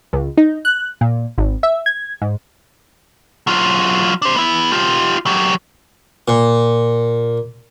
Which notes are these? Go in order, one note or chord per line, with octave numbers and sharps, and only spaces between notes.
C#2
D#4
F#6
A#2
G#1
E5
G#6
G#2
F#3 F4
D4 C5
B3 E4
F4 G4
F#3 G4
A#2